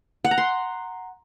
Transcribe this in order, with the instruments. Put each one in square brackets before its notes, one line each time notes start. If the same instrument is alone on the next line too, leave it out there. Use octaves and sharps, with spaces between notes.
[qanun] F#5
A#5
C6